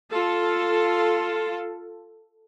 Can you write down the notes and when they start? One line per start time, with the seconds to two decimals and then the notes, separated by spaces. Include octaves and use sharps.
0.10 F4 A4